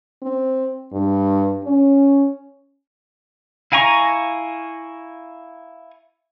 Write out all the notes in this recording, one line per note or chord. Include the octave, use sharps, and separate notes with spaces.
C4
G2
C#4
E4 F5 G#5 A#5 C#6